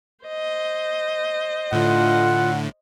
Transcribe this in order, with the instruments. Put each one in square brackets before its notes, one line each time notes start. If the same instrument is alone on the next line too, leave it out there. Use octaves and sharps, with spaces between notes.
[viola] C5 D#5
[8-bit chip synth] A2 D3 [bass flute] F4 [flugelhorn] F#5